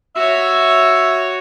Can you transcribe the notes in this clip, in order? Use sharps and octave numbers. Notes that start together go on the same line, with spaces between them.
F#4 C#5 E5